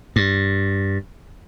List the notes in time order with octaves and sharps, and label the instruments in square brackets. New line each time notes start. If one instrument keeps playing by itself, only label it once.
[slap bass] G2